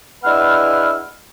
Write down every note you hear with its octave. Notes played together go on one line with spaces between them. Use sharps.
G#3 D4 E4 B4 F#5 F6